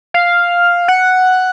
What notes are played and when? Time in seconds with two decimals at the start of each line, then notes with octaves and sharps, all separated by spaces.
0.14 F5
0.88 F#5